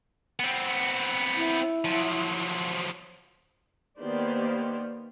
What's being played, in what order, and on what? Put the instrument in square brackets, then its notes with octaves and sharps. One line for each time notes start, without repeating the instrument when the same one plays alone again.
[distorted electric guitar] B3 C4
[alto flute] E4
[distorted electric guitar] F3 F#3
[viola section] D#3 A#3 B3 G4 C5 D5